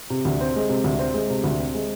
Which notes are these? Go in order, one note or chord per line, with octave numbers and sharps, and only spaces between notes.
C3
D2
C4
G#3
C3
D2
C4
G#3
C3
D2
C4
G#3